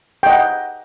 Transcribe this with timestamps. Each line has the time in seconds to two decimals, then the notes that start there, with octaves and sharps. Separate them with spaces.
0.23 G5
0.26 D#5
0.30 F#5